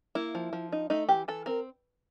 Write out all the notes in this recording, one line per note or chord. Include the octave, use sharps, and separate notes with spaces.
A#3 E4
F3
F3
D#4
A3 D#4
E3 G4
E3 A4
C4 A#4